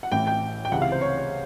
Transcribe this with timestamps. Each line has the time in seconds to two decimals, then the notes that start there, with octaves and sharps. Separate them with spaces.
0.03 F#5
0.12 A1 A2 E3 G5
0.27 G5
0.65 G5
0.71 C#2 C3 E3 F#5
0.82 F5
0.92 C5
1.01 C#5
1.17 C#5